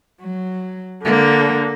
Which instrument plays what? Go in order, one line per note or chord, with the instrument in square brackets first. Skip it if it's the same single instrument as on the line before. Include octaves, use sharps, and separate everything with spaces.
[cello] F#3
[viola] D3 [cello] A#3